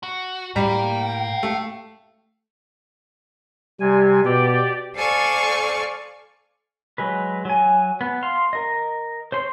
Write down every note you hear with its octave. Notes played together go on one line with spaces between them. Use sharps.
F#4
A2 G3 F5 G5 A#5
A3
C3 G3 G#5
B2 G4 D5 G5
A4 C5 D5 F5 G#5 C#6
F#3 G#3 B4
F#3 G#5
B3
F5 C6
A#4 D#5
C5 C#5 C6